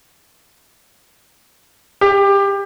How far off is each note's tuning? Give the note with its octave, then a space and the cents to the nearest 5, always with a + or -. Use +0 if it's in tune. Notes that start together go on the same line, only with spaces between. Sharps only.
G4 +20